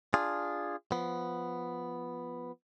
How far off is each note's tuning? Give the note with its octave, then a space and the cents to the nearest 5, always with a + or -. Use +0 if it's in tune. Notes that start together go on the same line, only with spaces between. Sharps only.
D4 +0 F4 +0 G#4 -10
F3 +0 B3 +0